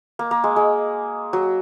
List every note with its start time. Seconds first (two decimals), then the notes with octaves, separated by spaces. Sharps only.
0.19 A#3
0.31 A#3
0.44 G#3
0.56 G#3
1.33 F#3